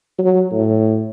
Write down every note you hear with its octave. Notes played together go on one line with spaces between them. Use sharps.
F#3
A2